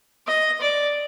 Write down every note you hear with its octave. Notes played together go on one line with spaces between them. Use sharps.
D#5
D5